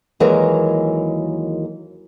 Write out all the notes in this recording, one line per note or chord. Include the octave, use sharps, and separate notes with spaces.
D#2 E3 F#3 G#3 A#4 A#5